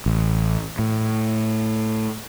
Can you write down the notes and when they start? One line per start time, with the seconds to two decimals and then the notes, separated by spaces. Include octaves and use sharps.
0.06 A1
0.79 A2